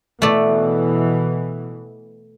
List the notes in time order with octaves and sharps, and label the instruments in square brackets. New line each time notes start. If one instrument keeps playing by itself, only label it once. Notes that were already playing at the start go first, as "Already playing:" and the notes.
[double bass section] B2 E3 [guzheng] A3 D5